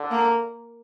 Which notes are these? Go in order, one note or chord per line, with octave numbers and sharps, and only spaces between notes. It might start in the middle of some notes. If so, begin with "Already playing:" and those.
Already playing: D3
A#3